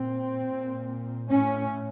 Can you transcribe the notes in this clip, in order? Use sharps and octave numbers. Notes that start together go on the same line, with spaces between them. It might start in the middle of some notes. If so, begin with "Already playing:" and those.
Already playing: A#2 C4
A#2
A2 C#4